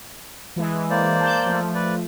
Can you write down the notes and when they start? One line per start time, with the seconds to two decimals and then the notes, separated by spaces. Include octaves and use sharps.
0.56 E3 G#3
0.90 A#3 C5 D5
1.21 A5 G6
1.46 F3 A3
1.75 B4 D5